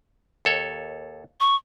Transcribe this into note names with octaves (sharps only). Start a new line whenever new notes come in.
D#2 A4 C#5
C#6